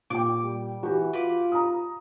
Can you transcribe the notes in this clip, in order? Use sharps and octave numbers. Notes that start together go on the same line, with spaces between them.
A#2 G5 D6
G3
E3 F#4 G4
F4 B4 B5 D6
A#5 D#6